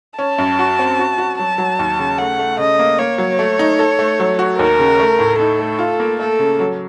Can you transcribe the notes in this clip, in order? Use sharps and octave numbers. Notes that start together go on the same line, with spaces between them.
C#4 A5
F#2
F#4
C4
F#4
F#4
F#3 A5
F#3
D#2
C#3
A3 F#5
A3
C#3 D#5
A#3
A#3 C#5
F#3
A3
D#4
A4
A3
F#3
F#4
D#2 A#4
C#3
A3
A2
D#4 A4
A3
F4
A#3
A3 A4
C#3
F#3